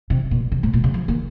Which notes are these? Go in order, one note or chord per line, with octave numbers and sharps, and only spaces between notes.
C3
A#2
C3
G#2
A#2
C#3
F3
A#3